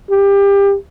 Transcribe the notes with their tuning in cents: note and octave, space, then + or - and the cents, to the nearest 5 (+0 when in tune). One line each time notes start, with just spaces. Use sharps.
G4 +25